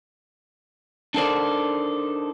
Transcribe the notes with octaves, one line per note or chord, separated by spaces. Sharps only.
D4 D#4 A4 A#4 C5 D5